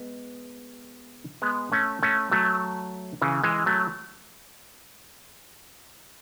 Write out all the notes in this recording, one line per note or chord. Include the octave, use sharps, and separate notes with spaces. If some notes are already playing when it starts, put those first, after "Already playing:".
Already playing: G#3 B3
G#3 B3
A3 C#4
A3 C#4
F#3 A3
C#3 E3
E3 G#3
F#3 A3